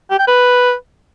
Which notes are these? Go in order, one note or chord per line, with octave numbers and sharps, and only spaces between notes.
G4
G5
B4